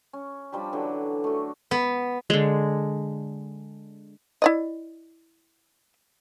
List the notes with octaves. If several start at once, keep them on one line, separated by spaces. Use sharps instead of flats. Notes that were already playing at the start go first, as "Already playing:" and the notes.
C#4
F3 G3 D4 G4
D3 E3 F#3
A3 F#4
B3
D3 G#3
E4 D5 D#5